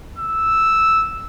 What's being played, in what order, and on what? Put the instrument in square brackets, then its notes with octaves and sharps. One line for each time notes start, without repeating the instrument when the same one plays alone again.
[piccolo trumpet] E6